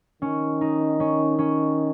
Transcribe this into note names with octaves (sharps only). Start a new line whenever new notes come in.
D#3 C#4
D#4
C#4
C#4